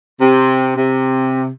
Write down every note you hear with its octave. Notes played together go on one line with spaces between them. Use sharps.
C3
C3